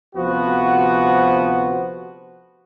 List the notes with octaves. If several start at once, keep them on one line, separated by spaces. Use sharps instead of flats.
D2 C3 F3 B3 F#4 C5